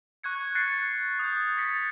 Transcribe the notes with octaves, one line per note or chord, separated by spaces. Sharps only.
C#6 F#6 G#6 C#7
F#6 A6 A#6 C7 C#7
D#6 F#6 G6
A6 B6 C#7